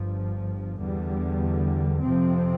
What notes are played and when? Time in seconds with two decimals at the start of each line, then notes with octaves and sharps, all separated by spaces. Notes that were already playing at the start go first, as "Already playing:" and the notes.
Already playing: G1 G2 F3
0.80 E2 D3 G3
2.03 F2 C3 F3 C4